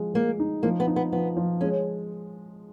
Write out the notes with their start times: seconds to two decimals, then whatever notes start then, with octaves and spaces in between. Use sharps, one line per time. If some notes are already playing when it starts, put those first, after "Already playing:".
Already playing: F3 G#3
0.14 G#3 A#3
0.40 D#4
0.63 F3 A#3
0.80 B3
0.87 D#4
0.96 B3
1.12 F3 B3
1.37 F3
1.61 G#3 C#4